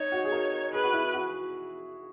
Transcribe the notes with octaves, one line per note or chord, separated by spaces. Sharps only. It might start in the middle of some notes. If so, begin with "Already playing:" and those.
Already playing: D#4 C#5
F#4
G#4
A#4
G#4 B4
F#4
E4
F#4